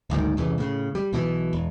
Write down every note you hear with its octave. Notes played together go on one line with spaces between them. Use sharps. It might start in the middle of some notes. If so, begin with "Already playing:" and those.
F#1 D2 G#2 D#3
E1 C2 C#3 E3
A2 C#3
G3
B1 B2 E3
E1